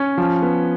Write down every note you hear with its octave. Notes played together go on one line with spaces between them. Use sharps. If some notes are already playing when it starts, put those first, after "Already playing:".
Already playing: C#4
F3
B3